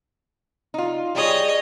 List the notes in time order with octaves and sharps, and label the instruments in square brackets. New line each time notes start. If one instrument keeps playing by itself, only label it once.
[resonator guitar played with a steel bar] D#4 F4
[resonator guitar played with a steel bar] G3 G#4 [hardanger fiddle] C#5 D#5